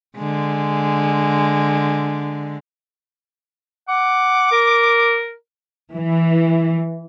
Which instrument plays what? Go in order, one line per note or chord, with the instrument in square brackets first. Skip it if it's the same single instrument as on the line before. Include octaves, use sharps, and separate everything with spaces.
[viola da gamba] D3 G#3
[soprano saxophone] F#5 [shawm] D6
[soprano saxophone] A#4
[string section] E3